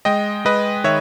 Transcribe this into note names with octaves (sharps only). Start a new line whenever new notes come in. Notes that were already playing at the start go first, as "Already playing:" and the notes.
G#3 D#5 G5
G#3 B4 D#5
D#3 C#5 E5